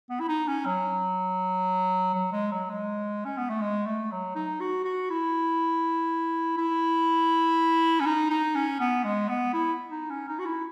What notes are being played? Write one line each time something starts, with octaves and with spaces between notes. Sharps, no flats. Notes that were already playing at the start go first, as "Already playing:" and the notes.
B3
E4
D#4
C#4
F#3
F#3
G#3
F#3
G#3
C#4
B3
A3
G#3
A3
F#3
D#4
F#4
F#4
E4
E4
C#4
D#4
D#4
C#4
B3
G#3
B3
E4
D#4
C#4
D#4
F#4
E4